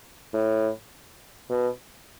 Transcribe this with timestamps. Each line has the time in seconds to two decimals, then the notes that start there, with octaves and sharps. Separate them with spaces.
0.33 A2
1.50 B2